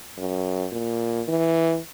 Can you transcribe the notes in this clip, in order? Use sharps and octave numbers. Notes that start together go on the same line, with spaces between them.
F#2
A#2
E3